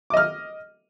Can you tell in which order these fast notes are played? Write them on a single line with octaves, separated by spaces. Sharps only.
D6 D#5 F6